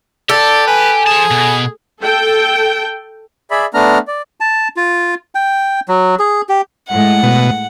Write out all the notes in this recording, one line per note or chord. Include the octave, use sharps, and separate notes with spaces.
G4 A4 D5
B4 G#5
F3 G#4 A5
B2
A4 G5
G#4 D5 E5 B5
A3 B3 D4 A#5 F6
D5
A5
F4
G5
F#3
G#4
G4
A2 G#3 F#5
B2